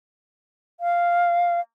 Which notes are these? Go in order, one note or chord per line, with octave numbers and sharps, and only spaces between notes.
F5